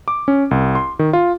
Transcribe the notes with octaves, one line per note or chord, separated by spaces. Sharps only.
D6
C#4
C2
C6
D#3
F4